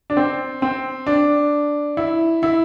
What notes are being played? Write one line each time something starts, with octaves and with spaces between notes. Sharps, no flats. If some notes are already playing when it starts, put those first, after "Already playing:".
D4
C4
C4
D4
E4
E4